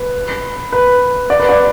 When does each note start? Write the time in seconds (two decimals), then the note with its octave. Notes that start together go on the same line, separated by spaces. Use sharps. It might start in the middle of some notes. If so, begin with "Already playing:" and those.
Already playing: B4
0.72 B4
1.30 D5
1.40 B4
1.49 D5